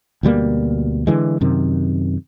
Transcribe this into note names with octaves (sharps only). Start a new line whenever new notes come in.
D2 B2 G3 A#3
D3 E3 G#3
F#2 C3 D#3